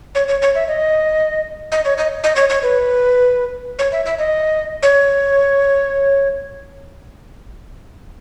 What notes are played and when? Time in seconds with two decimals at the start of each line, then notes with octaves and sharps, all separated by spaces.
0.15 C#5
0.28 C#5
0.42 C#5
0.55 E5
0.68 D#5
1.72 D#5
1.85 C#5
1.98 D#5
2.24 D#5
2.36 C#5
2.50 C#5
2.63 B4
3.79 C#5
3.92 E5
4.05 E5
4.19 D#5
4.83 C#5